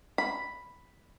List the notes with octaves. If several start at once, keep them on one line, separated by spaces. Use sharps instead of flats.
B5